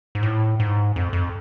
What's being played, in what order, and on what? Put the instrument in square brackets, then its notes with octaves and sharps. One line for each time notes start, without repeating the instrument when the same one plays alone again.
[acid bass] G#2
A2
G#2
F2
F2